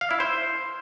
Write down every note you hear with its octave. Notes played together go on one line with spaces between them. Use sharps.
F5
E4
C5